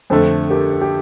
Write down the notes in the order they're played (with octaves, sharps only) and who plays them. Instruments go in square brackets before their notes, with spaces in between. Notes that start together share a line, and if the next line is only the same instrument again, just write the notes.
[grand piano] F2 D3 A3 [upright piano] A4 C5
[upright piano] G4 A#4
A4
G4